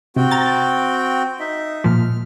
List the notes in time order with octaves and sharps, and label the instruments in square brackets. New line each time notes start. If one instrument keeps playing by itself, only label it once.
[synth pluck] C3 [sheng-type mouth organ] C4 F#4 G5
[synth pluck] A#5 A6
[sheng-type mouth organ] D#4 E5
[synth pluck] A#2 F3 [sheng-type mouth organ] F6